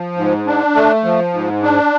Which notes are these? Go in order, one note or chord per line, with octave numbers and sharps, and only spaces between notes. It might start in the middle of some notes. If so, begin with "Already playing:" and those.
Already playing: F3
G#2
D4
A3
F3
G#2
D4